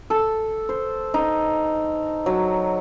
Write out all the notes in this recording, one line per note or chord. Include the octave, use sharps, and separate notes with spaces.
A4
C5
D#4
F#3